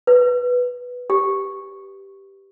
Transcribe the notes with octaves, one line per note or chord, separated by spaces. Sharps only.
B4
G4